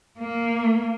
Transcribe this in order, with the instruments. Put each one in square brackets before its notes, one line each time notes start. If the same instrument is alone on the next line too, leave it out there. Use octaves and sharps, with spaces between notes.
[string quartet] A#3